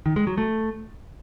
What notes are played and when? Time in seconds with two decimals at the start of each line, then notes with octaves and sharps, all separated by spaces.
0.06 D#3
0.16 G#3
0.27 F#3
0.38 A3